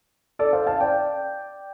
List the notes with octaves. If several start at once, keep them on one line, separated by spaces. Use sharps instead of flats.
A4 D5
C5 F5
F5 A5
D5 G5